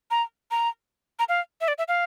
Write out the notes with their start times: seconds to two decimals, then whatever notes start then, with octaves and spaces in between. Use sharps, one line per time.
0.11 A#5
0.51 A#5
1.19 A#5
1.29 F5
1.61 E5
1.68 D5
1.78 E5
1.88 F5